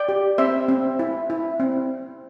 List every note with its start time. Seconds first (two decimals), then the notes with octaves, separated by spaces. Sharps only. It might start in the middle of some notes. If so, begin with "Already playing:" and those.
Already playing: D5 G5
0.09 G4
0.38 C4 C5 E5
0.68 C4
0.99 E4
1.30 E4
1.60 C4